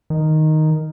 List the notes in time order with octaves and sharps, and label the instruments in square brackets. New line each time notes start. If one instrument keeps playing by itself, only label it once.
[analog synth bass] D#3